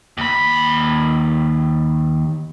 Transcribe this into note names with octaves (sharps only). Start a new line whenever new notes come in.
D#2 B5